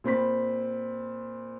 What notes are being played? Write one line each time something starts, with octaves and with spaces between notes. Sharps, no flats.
A#2 C4 B5 B6